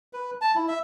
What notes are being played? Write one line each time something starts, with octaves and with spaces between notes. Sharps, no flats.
B4
A5
E4
E5